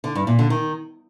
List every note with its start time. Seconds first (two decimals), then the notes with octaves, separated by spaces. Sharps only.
0.04 D3
0.15 G2
0.27 A#2
0.39 D3
0.50 D#3